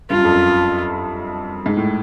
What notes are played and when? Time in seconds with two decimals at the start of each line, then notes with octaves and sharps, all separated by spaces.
0.10 G2 F4
0.18 F#2
0.24 F2
0.32 F#2
1.66 G#2
1.77 A2